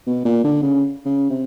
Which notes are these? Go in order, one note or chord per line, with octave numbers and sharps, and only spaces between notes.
B2
A#2
D3
C#3
C#3
C3